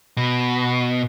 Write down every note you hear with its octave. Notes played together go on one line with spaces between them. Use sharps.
B2